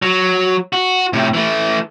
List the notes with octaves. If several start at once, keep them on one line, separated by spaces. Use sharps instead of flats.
F#3
F#4
A2 C3
E3 A3